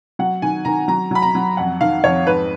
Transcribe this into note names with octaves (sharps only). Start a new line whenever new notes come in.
F#3 F#5
D#3 G#5
D#3 A#5
F#3 A#5
F#3 B5
A#5
F#3
F2 F#5
D#3 F5
F2 C#5
G#2 B4